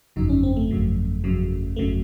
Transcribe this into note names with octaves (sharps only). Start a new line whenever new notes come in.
G1 F2 C#3 F#3 D#4
C#4
C4
A3
G1 F2 C#3 F#3
G1 F2 C#3 F#3
G1 F2 C#3 F#3 A3